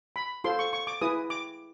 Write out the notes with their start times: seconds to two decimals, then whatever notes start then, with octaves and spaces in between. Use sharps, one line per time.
0.16 B5
0.44 F4 A4 C5 C6
0.59 C#6
0.73 C#6
0.87 D6
1.01 E4 G#4 B4 D#6
1.30 D6